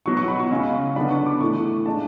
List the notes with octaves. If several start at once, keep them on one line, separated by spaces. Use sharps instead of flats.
B2 F#3 B3 C#6
C#6
B5
C#6
C#3 G#3 C#4
D3 F#3 B3 D4 B5
C#6
D6
A2 E3 A3 C#6
C#3 G#3 D4 A5